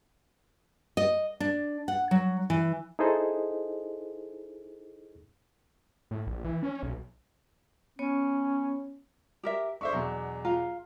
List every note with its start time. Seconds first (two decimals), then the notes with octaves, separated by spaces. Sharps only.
0.97 D#5
1.40 D4
1.88 F#5
2.11 F#3
2.50 E3
2.99 D#4 E4 G#4 A4 C5 D#5
6.11 A2
6.27 A#1
6.45 E3
6.63 C#4
6.83 B1
7.99 B3 C#4 C#5
9.43 G4 A#4 E5
9.81 D4 C5 E5 C#6
9.93 E2 B2 F#3
10.45 F4 F5 A#5